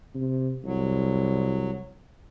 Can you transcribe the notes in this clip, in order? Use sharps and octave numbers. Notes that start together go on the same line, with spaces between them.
C3
C2 F#3